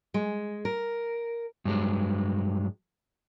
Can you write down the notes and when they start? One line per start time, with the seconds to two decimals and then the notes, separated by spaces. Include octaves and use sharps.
0.14 G#3
0.65 A#4
1.65 G2 F#3 G#3